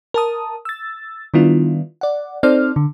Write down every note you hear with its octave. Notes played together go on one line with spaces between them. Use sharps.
A#4 A5 D#6
E6 A6
D#3 G3 B3 D4 E4 F4
D5 F#5
C4 D#4 A4 C5 D5 F6
D3